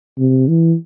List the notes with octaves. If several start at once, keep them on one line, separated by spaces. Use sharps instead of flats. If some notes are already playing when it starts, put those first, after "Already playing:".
C3
E3